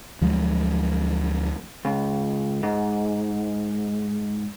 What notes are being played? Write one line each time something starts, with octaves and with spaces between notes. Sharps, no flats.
D2 F3 F#3 G#3
C#2
G#2